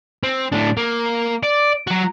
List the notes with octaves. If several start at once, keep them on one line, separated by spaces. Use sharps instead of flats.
C4
A2 D4
A#3
D5
F#3 F#4